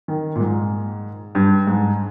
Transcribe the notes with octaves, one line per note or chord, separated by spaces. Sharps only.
D#3
A#2
G#2
G2
G#2